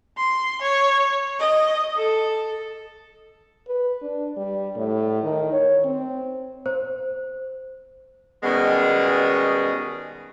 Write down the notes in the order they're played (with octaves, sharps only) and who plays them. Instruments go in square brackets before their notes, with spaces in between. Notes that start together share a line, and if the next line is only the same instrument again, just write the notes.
[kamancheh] C6
C#5
D#5
A4
[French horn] B4
D4
G3
A2
D#3
C#5
C4
[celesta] C5
[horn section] B2 D#3 G3 G#3 B3 C#4